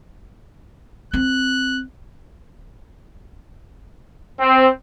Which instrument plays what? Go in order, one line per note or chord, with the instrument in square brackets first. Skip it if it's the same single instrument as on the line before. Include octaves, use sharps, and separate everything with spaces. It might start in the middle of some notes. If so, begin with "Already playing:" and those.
[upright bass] C4 [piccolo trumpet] F#6
[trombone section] C4